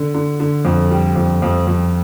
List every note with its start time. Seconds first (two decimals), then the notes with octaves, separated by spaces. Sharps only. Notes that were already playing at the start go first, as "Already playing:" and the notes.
Already playing: D3
0.14 D3
0.40 D3
0.65 F2
0.91 G3
1.16 F2
1.42 F2
1.67 F2